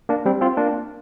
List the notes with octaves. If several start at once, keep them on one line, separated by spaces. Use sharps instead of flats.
A#3 D4
G3 C4
C4 F4
A#3 D4